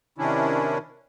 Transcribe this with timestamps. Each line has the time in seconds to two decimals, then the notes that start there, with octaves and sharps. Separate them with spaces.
0.18 C3 D#3 C#4 D4 E4